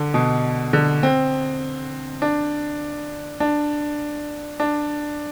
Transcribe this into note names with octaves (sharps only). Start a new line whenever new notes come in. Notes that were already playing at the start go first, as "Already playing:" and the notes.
Already playing: D3
B2
D3
C4
D4
D4
D4